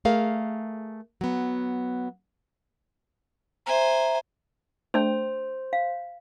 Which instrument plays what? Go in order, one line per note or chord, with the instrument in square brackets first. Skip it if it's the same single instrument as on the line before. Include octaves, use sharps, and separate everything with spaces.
[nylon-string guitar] A3 G#4 A#4 F5
F#3 B3
[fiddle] C5 G#5 [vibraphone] E5 A#5
[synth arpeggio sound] A3 D4 G5 [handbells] C5
[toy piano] F5